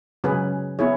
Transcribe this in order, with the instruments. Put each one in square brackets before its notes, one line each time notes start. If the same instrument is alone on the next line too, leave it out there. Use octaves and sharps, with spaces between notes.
[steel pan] C#3 F#3 C#4 G#4 B4
B3 E4 G#4 C#5